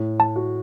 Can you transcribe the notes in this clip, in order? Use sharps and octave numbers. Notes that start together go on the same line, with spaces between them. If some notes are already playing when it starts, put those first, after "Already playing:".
Already playing: A2
A5
F#4